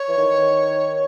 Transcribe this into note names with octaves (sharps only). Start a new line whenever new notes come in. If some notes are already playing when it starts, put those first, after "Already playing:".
Already playing: C#5
E3
D#3